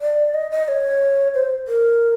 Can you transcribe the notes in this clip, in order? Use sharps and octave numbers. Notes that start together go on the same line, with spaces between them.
D5
D#5
D#5
C#5
C5
A#4